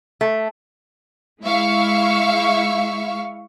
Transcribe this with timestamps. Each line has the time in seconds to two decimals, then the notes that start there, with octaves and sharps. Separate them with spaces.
0.21 A3
1.43 G#3 E4 E5 F5 C#6